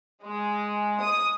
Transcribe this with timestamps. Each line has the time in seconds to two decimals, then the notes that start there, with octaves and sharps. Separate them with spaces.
0.25 G#3
1.02 D#6